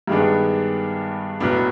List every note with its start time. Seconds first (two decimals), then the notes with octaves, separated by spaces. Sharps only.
0.08 G2 D#3 G#3 B3 D4
1.40 B1 A2 F#3 B3 D4